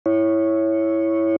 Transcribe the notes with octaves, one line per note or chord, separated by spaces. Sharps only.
E4 C#5